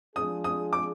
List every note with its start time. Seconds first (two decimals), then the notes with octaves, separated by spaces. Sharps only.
0.16 F3 G#3 D4 F4 G#4 D#6
0.44 D#6
0.73 D6